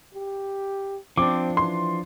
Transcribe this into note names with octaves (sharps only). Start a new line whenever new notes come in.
G4
F3 C4 D4 D6
E3 C6